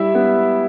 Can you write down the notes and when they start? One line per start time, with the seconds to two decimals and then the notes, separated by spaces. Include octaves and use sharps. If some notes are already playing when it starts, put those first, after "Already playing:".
Already playing: G3 E4 E5
0.15 B3